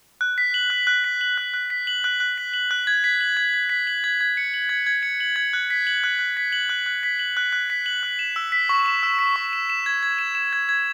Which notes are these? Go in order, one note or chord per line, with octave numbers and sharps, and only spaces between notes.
F#6
B6
F#7
F#6
F#6
B6
F#7
F#6
F#6
B6
F#7
F#6
F#6
B6
F#7
F#6
G#6
B6
F#7
G#6
G#6
B6
F#7
G#6
G#6
C#7
F#7
G#6
G#6
C#7
F#7
G#6
F#6
B6
F#7
F#6
F#6
B6
F#7
F#6
F#6
B6
F#7
F#6
F#6
B6
F#7
F#6
E7
E6
B6
C#6
E7
E6
B6
C#6
E7
E7
G#6
G#6
E7
E7
G#6
G#6